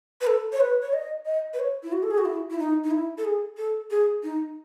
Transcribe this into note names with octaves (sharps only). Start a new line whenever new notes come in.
B4
A4
C#5
B4
C#5
D#5
D#5
B4
C#5
E4
F#4
A4
G#4
F#4
E4
E4
D#4
D#4
E4
A4
G#4
A4
G#4
D#4